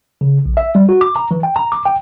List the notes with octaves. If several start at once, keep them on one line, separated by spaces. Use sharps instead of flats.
C#3
A#1
E5
G3
F#4
D6
A#5
E3
G5
A#5
D6
G5